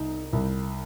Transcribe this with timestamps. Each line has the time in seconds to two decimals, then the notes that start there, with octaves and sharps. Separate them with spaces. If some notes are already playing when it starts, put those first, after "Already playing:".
Already playing: C2 D#4
0.33 C2